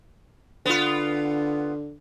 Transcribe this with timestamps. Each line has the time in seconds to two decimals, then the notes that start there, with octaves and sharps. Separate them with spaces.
0.66 D3 B3 F4